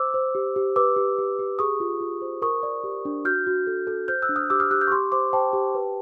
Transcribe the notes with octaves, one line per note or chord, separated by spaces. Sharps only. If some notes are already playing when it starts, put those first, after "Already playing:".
Already playing: C5 D6 E6
C5
G4
G4
B4 D6 E6
G4
G4
G4
G#4 C#6 D#6
F4
F4
C5
A#4 C#6 D#6
D5
G4
D4
F#4 F6 G6
F#4
A4
A4
C5 F6 G6
E6 F#6
D4
D#6 F6
G4 D6 E6
D#6 F6
G4 E6 F#6
F6 G6
C#6
G4 C6 D6
C5 C6 D6
C5 G5 A5
G4
B4